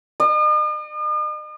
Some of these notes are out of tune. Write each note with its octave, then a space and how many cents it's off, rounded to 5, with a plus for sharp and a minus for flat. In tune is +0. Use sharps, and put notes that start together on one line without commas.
D#5 -45